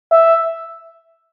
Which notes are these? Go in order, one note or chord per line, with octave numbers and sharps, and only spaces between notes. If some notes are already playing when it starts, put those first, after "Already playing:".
E5